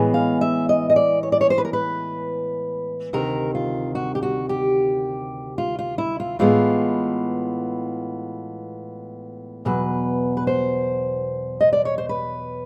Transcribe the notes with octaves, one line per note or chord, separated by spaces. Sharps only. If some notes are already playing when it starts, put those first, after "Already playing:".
Already playing: A2 E3 G#3 B3
F5
E5
D#5
D#5
D5
C#5
D5
C#5
C5
B4
A#4
B4
D2 C3 D#3 A#4
F4
F#4
G4
F#4
G4
F4
F4
E4
F4
A2 E3 G#3 B3 F4
E2 B2 F#3 B4
B4
C5
D#5
D5
C#5
C5
B4